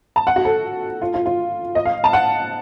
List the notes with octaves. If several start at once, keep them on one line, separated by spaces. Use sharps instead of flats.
A5
F#5
F#4
A4
F4
F4
F4
D#5
F5
A5
F#5